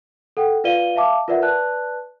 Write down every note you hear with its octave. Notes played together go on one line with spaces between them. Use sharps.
A4 F#5 G5
F4 B4 D5 F5 D#7 G7
E5 F5 A5 D6
F4 A#4 B4 D5 E5 F#5
B4 D5 A5 F#6